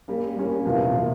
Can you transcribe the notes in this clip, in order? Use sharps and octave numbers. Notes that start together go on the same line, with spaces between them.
G3 A#3 C#4
G3 A#3 C#4
E2 C3 F3 A#3 F4
C3 F3 A#3 F4